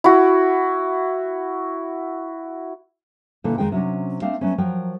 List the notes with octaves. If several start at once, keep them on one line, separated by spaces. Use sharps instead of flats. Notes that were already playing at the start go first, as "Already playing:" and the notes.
E4 F#4
A#2 D3 E3 A#3 A4
F2 D#3 G#3 D#4 G5
C3 F#3 C#4 D4
A3 C4 D4 F5
F#3 A3 B3 C#4
F3 F#3 A#4 G5